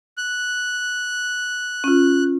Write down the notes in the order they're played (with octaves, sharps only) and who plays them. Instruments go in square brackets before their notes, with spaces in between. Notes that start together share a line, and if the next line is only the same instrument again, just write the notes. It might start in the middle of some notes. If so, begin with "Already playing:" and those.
[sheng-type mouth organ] F#6
[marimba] C#4 F4